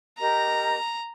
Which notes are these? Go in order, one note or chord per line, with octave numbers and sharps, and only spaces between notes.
G4 A#4 D#5 A#5